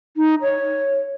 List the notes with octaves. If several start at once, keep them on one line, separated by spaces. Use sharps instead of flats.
D#4
C#5